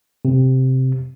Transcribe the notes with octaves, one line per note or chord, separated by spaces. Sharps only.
C3